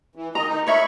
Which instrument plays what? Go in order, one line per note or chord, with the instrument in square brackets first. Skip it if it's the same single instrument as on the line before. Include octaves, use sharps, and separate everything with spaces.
[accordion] E3
[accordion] D#3 D#5 [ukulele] A#5
[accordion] D#4
[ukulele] A#4 C#5 E5 [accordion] B5 C#6